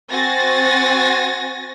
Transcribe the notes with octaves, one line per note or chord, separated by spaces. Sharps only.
C4 F#4 G#5 A6 A#6